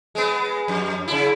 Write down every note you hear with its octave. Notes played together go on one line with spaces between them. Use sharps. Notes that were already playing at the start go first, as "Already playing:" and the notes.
G#3 B3
F2
C#3 E4